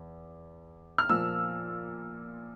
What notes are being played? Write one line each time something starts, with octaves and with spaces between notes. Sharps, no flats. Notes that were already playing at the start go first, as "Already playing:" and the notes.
Already playing: E2
F6
A#2 F3 A#3 E6